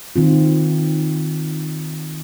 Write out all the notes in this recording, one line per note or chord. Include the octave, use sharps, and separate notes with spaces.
D#3 C4 F4